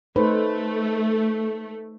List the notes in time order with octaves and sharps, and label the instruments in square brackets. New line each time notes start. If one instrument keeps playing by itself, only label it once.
[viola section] A3 [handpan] D#4 B4 C5